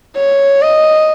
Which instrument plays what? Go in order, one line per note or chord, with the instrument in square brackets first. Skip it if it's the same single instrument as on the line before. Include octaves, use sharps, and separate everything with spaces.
[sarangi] C#5
D#5